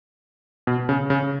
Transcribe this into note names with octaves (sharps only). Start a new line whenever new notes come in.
B2
C#3
C#3